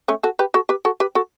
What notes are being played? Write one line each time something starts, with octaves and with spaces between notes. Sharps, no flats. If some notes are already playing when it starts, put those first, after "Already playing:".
A3 C#4
F#4 A4
G4 B4
F#4 A4
G4 B4
F#4 A4
G4 B4
F#4 A4